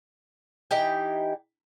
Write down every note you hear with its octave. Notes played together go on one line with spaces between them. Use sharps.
E3 D#4 G4 G5